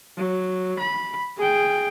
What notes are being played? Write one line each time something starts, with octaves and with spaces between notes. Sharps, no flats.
F#3
B5
G#4 G5